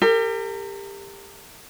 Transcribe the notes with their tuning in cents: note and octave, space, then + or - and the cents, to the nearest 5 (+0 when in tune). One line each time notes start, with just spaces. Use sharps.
G4 +25 A#4 -35